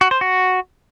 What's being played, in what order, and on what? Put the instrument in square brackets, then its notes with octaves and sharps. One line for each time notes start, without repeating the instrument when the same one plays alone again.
[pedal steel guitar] F#4
C5
F#4